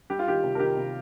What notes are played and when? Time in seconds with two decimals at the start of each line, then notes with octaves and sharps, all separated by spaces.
0.10 G3 G4
0.19 F4
0.27 D#3 G4
0.44 C3
0.55 A#4
0.60 D#3 G4
0.77 C3